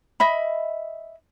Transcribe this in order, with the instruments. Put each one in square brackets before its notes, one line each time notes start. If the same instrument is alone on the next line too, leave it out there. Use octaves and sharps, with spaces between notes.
[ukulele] D#5 E5 B5